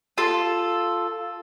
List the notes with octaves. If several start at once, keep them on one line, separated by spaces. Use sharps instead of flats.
F4 A4